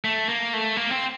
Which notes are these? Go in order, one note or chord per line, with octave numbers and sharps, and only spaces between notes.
A3
A#3
A3
A#3
C4